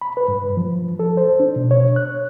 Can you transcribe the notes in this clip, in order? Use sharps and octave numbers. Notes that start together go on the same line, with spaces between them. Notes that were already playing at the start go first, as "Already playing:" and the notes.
B5
B4
G2
F3
A4
C5
D4
B2
C#5
F#6